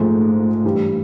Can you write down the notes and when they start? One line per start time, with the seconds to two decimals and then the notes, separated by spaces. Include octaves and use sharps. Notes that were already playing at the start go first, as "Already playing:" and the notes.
Already playing: A#1 G#2 F3 G#3 A3
0.64 G2 E3 G3